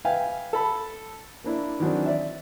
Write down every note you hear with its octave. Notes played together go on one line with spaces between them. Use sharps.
B4 E5 F5 G5 G#5
A4 B5
A#3 D4 E4
D#3 E3 F#3 C4 D4
D5 E5